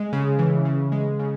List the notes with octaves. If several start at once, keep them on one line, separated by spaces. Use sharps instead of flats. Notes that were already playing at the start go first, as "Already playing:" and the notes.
Already playing: G#3
C#3
E3
C#3
G#3
C#3